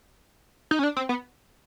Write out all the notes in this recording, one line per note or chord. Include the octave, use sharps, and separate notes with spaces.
D#4
C#4
D4
C4
B3